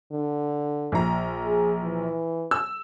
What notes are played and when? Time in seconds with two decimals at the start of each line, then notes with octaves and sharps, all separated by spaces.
0.11 D3
0.92 A#1 A#5
1.45 G#4
1.83 E3
2.51 E6